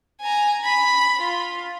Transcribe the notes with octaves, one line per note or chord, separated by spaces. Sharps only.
G#5 A#5
B5
F4